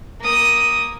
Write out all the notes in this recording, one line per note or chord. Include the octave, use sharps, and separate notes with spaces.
A#3 D#6